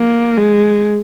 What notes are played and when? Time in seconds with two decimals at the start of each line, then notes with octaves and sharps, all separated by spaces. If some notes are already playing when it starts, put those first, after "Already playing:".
Already playing: A#3
0.37 G#3